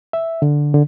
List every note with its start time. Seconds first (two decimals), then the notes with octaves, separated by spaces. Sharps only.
0.13 E5
0.42 D3
0.74 D3